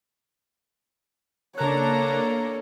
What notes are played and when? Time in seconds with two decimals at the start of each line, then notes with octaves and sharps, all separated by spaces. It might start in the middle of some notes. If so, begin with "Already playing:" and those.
1.58 C#3 A#3 D4 A4 A#4 C#5 A#5 F#6